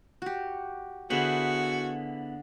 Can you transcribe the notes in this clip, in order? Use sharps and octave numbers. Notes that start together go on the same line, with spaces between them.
F#4 G4
D3 B3 E4 F#4 G#4 C5